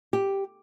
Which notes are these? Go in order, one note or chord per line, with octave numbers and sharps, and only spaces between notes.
G4